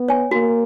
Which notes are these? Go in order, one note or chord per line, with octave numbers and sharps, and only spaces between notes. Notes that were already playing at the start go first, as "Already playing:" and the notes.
Already playing: B3
C#5 G#5
A#3 F#4